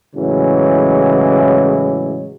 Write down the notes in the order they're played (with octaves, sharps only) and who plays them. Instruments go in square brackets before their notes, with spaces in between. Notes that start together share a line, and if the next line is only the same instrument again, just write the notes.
[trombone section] A2 C#3 E3 F#3 G#3